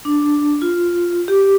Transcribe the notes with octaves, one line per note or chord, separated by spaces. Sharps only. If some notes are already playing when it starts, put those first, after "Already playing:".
D4
F4
G4